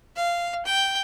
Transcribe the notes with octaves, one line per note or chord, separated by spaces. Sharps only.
F5
G5